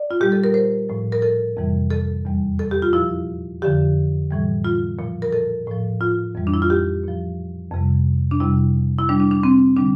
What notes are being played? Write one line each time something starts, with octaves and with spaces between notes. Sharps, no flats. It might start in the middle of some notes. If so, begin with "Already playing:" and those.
Already playing: D5
F4
A#2 G3 G4
A4
A#4
C5
A2 F3
A#4
A4
F2 C3 E3 G3
A4
E2 E3 G3
A4
G4
F4
A#2 F3 E4
F2 D3 F3 G4
A2 E3 G3
F4
A#2 F3
A#4
A4
A2 F3
F4
F2 E3 G3
D4
E4
F4
G4
A#2 F3
F2 C3 G3
D4
F2 C3 G3 E4
E4
A#2 G3 D4
D4
D4
C4
D3 G3 D4